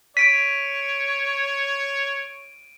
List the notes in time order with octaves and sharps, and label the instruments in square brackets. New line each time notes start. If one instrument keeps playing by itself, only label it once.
[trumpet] C#5 [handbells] B6 [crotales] D7 D#7